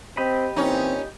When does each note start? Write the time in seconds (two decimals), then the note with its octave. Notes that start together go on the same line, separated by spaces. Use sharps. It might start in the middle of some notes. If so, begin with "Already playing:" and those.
0.17 C4 G4 D#5 B5
0.56 A#2 E3 C4 C#4 D#4